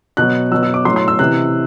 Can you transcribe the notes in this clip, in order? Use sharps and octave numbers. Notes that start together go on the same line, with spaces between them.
B2 F#3 F#6
B2 F#3 E6
E6
D6
A2 F#3 C6
C6
E6
C3 E3 F#6